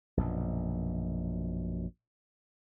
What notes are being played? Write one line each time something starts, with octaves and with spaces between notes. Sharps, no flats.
A#1 F#2 B2